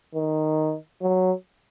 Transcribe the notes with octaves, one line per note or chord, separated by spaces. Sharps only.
D#3
F#3